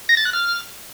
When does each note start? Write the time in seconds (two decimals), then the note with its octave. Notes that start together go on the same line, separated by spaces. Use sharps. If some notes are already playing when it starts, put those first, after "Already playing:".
0.09 A#6
0.17 A6
0.25 F#6
0.33 F6